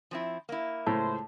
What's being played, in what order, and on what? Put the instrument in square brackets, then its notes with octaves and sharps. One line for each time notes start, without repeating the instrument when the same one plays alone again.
[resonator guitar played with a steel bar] F3 C4 E4
A#3 E4
[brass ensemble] C#2 C5 [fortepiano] A2 [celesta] A5